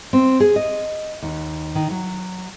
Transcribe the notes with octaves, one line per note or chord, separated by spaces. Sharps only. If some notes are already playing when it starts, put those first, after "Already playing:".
C4
G#4
D#5
D#2
D#3
F#3